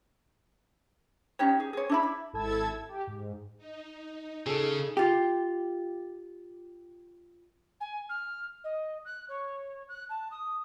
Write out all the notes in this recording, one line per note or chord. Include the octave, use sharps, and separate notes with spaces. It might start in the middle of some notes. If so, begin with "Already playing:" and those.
C#4 D#4 G4 C#5
G#4
G#4 C#5
D4 E4 B5
E4
G#1 E4 A4 A5 E6 G#6
G4
G#2
D#4
C#3 D#4 G#4 A4
F4 G4
G#5
F6
D#5
F#6
C#5
F#6
A5
D#6